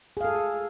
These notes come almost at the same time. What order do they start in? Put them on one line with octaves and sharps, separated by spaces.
G#4 F5 A4